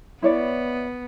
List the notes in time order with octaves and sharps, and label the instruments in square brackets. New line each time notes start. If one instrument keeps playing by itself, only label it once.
[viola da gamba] B3 [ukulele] E4 C#5 D5